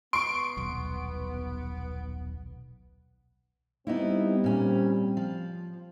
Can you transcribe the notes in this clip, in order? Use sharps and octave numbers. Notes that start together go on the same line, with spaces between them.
B3 C6 C#6 D7
D#1 B1
G3 B3 C4 D#4 E4
A#2 C#4
F3